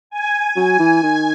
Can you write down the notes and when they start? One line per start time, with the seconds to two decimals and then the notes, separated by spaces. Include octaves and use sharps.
0.10 G#5
0.56 F#3 G#5
0.79 E3
1.03 D#3